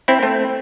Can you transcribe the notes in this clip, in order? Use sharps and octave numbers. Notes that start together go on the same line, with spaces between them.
C4 E4
A3 C4